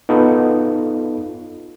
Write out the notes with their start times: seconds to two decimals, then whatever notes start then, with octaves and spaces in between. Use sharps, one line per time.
0.09 B3 D#4 F4 A4